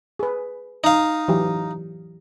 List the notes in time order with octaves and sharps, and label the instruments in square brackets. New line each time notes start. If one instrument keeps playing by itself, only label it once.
[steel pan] G#4 B4
[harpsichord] D#4 F5
[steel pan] E3 F#3 G4